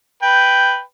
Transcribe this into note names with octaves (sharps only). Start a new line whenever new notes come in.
B4 G5